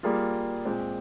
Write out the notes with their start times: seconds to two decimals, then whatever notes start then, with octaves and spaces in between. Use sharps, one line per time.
0.03 G3 A#3 F4 G#4
0.65 A#2 G#3 C4